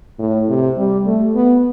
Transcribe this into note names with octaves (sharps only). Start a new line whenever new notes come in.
A2
C3
G3
A3
B3